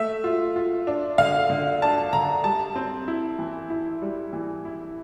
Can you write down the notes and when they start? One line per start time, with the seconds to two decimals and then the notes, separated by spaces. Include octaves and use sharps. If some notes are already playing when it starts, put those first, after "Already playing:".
Already playing: A3 E5
0.24 F4
0.56 F4
0.87 D4
1.18 D3 F5
1.50 D3
1.82 D4 A5
2.13 D3 A#5
2.44 G3 A5
2.76 C4
3.08 E4
3.39 E3
3.70 E4
4.02 G3
4.33 E3
4.65 E4